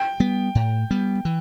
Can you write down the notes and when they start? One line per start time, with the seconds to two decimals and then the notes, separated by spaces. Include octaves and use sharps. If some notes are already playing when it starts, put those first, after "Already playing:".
Already playing: G5
0.20 G3 B3
0.55 A2
0.91 G3 B3
1.25 E3